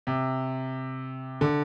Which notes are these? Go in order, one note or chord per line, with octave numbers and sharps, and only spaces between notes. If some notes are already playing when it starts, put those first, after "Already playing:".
C3
D3